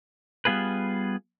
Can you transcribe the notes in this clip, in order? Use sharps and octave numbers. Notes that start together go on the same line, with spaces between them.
G3 B3 F4 G#4 B4